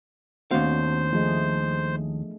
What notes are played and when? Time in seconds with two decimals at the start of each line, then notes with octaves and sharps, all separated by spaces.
0.51 D#2 A3 B3 C4 D4 F#4 C5 F5
1.13 F3 A3 G#4 D#5